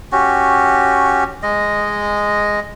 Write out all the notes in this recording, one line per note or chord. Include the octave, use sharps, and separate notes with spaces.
C#4 F#4 G4
G#3 D#5